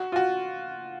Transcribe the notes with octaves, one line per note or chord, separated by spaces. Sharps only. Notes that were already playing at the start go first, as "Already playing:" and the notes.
Already playing: F#4
F4
F#4